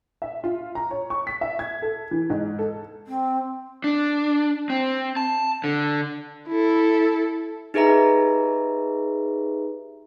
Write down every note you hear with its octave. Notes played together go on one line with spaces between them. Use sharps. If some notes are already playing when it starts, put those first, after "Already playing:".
E5
F4
A#5
C#5
C#6
B6
E5
G#6
A4
E3
G#2
A4
C4
D4
C4
A5
D3
E4 A4
D#4 G4 G#4 B4 E5 A#5